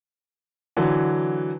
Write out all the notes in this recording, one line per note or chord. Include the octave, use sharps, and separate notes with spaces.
D3 E3 F#3